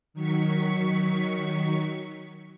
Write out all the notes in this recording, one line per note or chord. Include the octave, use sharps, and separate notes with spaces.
D#3 F#3 C#6 B6